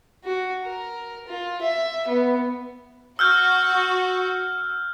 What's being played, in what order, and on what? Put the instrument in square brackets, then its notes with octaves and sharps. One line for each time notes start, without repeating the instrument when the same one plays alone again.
[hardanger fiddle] F#4
A#4
F4
E5
B3
[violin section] F#4 [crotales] E6 F6 G6